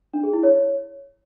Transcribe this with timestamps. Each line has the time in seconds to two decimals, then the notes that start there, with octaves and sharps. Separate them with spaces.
0.14 D4
0.23 G#4
0.33 E4
0.43 C#5